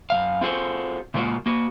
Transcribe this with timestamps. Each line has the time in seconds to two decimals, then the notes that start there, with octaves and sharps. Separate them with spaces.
0.10 F#2 D#3 F5
0.41 C4 F4 F#4 G#4 A4 C5
1.14 A#2 C#3 G#3 A#3 F4 F#4
1.46 A#3 F#4